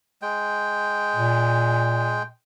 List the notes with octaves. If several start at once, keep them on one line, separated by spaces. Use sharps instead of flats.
G#3 G5
A#2